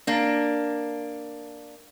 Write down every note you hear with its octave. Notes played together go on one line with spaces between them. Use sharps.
A#3 D4